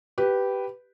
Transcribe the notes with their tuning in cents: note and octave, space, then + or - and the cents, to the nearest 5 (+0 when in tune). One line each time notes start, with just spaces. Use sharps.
G4 -10 B4 +0